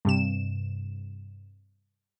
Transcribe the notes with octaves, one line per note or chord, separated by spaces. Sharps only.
G2 C3 E7